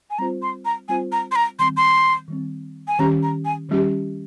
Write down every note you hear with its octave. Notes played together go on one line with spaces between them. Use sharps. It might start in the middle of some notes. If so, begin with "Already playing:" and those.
G#5
G3 C4 F4 C5 A#5
C6
A#5
G3 C4 F4 C5 G#5
A#5
C6
A#5
D#3 G3 C4 C6
C6
D#3 G3 C4
G#5
D#3 G3 C#4 G4 A#5
A#5
G#5
D#3 G3 C#4 G4